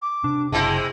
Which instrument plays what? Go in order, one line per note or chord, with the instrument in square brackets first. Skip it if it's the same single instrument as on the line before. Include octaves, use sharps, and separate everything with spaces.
[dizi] D6
[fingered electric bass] C3 [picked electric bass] D4
[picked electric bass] F#1 [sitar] G#3 C4 E4 [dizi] A5